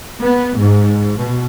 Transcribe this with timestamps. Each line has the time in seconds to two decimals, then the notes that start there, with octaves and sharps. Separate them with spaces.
0.22 B3
0.58 G#2
1.18 B2